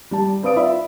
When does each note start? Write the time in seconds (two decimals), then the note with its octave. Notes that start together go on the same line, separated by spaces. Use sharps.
0.11 G3 A5
0.43 C4 B4 D5 F5 D#6 D7
0.56 F4 D5 E5 B5